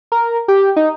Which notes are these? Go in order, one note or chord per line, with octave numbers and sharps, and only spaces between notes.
A#4
G4
D#4